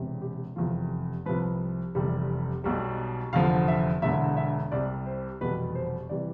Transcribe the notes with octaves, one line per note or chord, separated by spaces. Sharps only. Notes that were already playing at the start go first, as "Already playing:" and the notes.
Already playing: E1 E2 C3
G4
F1 E2 C3 F3 F4
C2 C3 F3 B4
F1 E2 C3 G3
B1 B2 G3
F1 E2 D3 F3 F5
E5
E1 E2 D3 E5
E5
C2 C3 G3 D5
C5
F1 E2 B2 G3 B4
C5
C3 E3 G3 D5